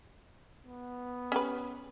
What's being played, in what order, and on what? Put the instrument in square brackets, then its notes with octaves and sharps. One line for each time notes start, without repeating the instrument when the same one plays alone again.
[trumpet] B3
[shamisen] C#4 G4 B4